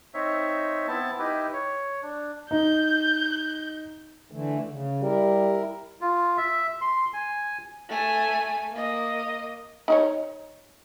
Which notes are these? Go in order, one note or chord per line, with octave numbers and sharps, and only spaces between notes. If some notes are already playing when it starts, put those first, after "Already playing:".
C4 D#4 C#5 E5
B3 C4 E4 A5
D#4 E4 G4 B4
C#5
D4
D#4 G6
D3 E3 A3
C#3
G3 E4 A#4
F4
E5
C6
G#5
A3 G#5
A#3 D#5
D#4 C5 C#5